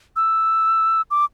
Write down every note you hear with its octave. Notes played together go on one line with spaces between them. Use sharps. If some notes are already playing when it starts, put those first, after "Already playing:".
E6
D6